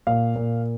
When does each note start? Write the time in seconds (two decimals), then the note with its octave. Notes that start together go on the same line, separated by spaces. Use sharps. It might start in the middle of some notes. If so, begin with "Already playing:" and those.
0.07 A#2 F5
0.36 A#2